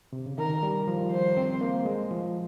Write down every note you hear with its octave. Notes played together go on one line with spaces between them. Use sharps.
C3
C#3
D#3 A#4
G3
F3
C5
C4
A#3
G#3
F3